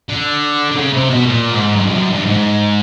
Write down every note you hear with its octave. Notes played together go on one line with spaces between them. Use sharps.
D3
D3
C#3
C3
B2
A#2
G#2
G2
F2
F#2
G2
G#2